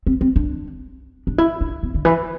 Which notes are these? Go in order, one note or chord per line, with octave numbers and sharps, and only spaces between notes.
C4
C4
D4
D4
E4
D4
B3
D3
E3